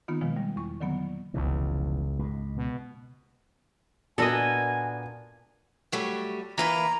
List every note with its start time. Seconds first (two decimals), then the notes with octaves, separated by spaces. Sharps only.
0.08 D#3 A#3 B3 D#4 F4
0.21 B2 D#3 F3 G#3
0.36 G3
0.56 E2 C#6
0.80 D3 D#3 F#3 A#3 B3
1.34 F1 C#2 B2 E3
2.19 C#2 G#2
2.56 B2
4.18 A#2 B3 D4 F#4 A4 A#4 D#5 G#5
5.92 F#3 G3 A3
6.58 E3 A#3 B4 A#5